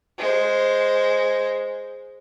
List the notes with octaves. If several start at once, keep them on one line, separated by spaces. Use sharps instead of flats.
G#3 C5